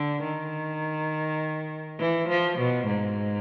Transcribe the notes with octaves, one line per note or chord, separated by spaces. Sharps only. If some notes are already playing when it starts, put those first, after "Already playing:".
Already playing: D3
D#3
E3
F3
B2
G#2